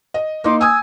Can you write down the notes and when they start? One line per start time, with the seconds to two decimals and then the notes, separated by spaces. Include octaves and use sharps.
0.14 D#5
0.44 A#3 D#4 C6 D6
0.61 G#5 D#6 E6 G#6